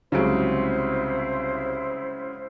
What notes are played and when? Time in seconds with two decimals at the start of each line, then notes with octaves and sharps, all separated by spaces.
0.12 C2 C#3 F#3 G#3 E4 F#4 C5 D7